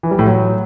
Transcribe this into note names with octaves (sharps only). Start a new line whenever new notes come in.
E3
G3
A2
F#3